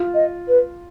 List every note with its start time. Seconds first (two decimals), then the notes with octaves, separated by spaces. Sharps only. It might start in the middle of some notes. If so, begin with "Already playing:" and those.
Already playing: F4
0.14 D#5
0.48 B4